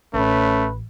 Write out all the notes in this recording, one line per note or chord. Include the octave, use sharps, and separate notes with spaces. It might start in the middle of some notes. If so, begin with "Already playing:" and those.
A1 A3 C#4 B4